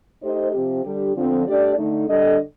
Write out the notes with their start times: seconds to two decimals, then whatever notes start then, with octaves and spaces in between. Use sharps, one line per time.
0.21 A3 D#4 G4 C5 D#5
0.52 C3 F3 C4 G4
0.83 D3 G3 D4 G4
1.14 D3 F3 C4
1.45 A3 D4 G4 D5
1.75 D3 A3 D#4
2.08 D3 G3 D4 A4 D#5